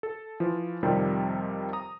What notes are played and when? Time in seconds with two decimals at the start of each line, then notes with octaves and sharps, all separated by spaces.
0.03 A4
0.40 E3 F3 F4
0.83 F2 C3 D#3 F3 G3
1.73 A#5 D#6